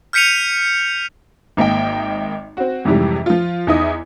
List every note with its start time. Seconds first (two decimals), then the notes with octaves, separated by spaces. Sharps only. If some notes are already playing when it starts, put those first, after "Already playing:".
0.13 F6 G6 B6 C#7 D#7 F7
1.57 G#1 A#3 D#5 E5 G5
2.57 C4 F#4
2.85 F2 G#2 C3 E3 G3
3.26 F3 F4
3.67 E2 D#4 E4 D#5 D#6